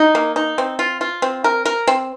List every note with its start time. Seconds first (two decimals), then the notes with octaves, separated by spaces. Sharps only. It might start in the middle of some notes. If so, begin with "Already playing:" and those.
Already playing: D#4
0.15 A#3
0.36 D#4
0.58 C4
0.79 F4
1.01 F4
1.22 C4
1.44 A#4
1.65 A#4
1.87 C4